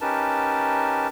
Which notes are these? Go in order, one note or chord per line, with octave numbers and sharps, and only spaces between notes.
C#4 D#4 G4 A#4 B4 A5